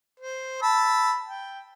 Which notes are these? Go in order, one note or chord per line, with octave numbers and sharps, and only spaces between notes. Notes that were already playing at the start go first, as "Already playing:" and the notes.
C5
A5 B5 E6
G5